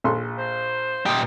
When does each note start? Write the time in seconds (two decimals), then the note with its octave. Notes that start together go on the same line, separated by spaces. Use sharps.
0.04 A#1 A4 C6
0.38 C5
1.06 A#2 D#4 G4